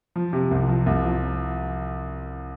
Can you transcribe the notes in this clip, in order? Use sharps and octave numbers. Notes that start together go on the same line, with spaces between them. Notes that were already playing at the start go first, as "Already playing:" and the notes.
F3
C3
C2
F3
C2
F3